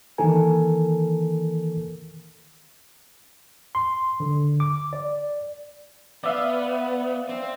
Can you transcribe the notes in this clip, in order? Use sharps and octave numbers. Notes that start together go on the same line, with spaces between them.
D#3 E3 A#3 A4 A#4 G#5
C6
D3
D6
D5
B3 D5 E5 F5
C4